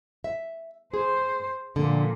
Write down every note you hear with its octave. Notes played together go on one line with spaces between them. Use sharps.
E5
G#4 C5
A#2 D3 F3